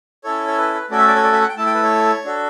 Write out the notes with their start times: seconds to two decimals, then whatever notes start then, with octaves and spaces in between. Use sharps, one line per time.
0.24 C#4 E4 A4 C#5
0.47 C#5
0.58 B4
0.74 B4
0.90 A3 C#4 F#4 A4 D5
0.99 E5
1.08 D5
1.16 C#5
1.24 D5
1.33 E5
1.41 F#5
1.49 G5
1.57 A3 E4 A4 A5
1.66 G5
1.74 B4
1.83 C#5
2.25 D4 F#4 A4